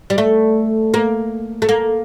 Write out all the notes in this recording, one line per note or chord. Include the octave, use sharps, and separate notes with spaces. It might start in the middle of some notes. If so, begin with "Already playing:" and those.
G3
A3
A#3
A3
A#3